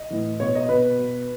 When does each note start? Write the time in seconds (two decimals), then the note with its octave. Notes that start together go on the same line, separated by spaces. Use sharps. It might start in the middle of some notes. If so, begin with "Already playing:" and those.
Already playing: D#5
0.10 A2 E3
0.40 B2 C#5
0.55 D#5
0.69 B2 B4
0.99 B2